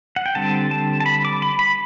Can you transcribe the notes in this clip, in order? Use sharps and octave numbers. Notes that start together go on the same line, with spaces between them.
F#5
G5
D3 G3 C4 A5
A5
A5
B5
D6
B5
B5